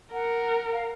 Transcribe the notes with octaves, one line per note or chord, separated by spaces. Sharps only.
A#4 F#5
F5